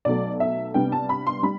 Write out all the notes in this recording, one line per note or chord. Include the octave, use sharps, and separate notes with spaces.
B1 B2 F#3 A3 D5
E5
C2 C3 G3 B3 D4 G5
A5
B5
C6
G3 B5